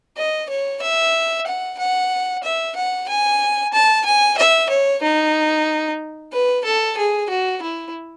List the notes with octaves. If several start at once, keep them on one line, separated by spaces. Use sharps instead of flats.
D#5
C#5
E5
F#5
F#5
E5
F#5
G#5
A5
G#5
E5
C#5
D#4
B4
A4
G#4
F#4
E4